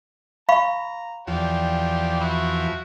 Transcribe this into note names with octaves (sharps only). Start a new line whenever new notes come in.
F5 A#5 B5 C#6
E2 F3 G4 D5
E4 F#4